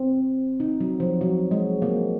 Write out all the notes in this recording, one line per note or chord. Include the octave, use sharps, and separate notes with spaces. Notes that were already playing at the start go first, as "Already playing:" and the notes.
Already playing: C4
D#4
F#3
F3
F#3
G#3
A#3